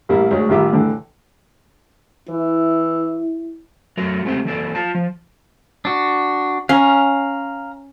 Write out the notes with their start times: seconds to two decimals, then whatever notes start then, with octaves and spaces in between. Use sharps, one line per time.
0.09 A1 G3 A#3 E4
0.31 D2 G#3 C#5
0.49 A1 D#3 G3 F4 E5 D6
0.72 A2 D3 E3
2.30 E3 E4
3.97 F#3 A3 F#4 A#4
4.25 G#3 A3 C4 G4 G5
4.45 E3 A#3 A4 D5
4.75 F4 A5
4.95 F3
5.85 D4 F#4
6.69 C#4 F5 A#5